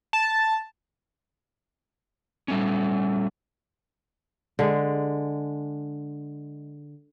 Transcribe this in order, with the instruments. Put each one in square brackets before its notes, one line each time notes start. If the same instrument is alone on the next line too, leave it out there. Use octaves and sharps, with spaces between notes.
[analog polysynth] A5
[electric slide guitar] G3 A3 C#4
[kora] D3 G#3